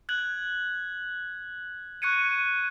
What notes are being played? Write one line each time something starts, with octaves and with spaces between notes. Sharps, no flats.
F#6 G#6 F#7
C#6 F#6 G#6 C#7 D#7